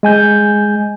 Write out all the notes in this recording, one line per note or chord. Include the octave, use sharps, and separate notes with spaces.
G#3 G#5 G6